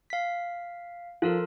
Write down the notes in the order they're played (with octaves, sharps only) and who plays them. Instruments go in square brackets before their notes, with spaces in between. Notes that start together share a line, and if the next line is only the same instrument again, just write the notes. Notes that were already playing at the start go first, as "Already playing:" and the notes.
[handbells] F5 B6
[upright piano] F3 [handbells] F4 A4 A#4